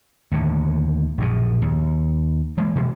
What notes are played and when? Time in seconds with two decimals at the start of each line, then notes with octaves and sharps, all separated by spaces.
0.32 D#2 A2 D3
1.18 A#1 F#2 B2
1.62 D#2
2.57 E3 G#3 A#3
2.75 B2 E3 F3